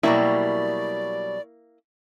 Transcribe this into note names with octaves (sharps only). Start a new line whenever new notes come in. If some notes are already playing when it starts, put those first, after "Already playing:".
B2 F#3 G3 A#3 E4 D5